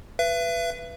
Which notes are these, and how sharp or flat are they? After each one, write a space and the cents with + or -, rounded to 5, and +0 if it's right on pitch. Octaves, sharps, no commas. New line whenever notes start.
B4 +0 E5 +40